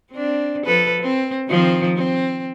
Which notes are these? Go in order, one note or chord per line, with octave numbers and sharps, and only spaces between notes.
C4 D4
F3 A4 B4
C4
D#3 F3 C4
C4